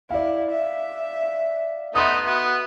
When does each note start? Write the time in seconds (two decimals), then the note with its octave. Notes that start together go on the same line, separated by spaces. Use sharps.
0.10 E4 D5 F5
0.51 E5
1.95 A3 B3 D#4 E5 C6 D#6
2.26 B3 F#4